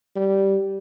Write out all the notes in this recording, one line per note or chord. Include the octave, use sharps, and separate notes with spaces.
G3